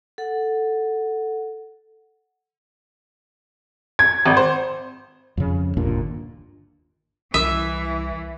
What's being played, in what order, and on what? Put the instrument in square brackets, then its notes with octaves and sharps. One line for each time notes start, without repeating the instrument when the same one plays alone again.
[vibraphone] A4 F#5
[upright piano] G#6
G#1
C5
[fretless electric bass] F2 C#3
G1 D#2 A#2 D4
[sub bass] C2 [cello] E3 [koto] E5